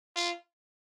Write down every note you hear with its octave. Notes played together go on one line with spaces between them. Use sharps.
F4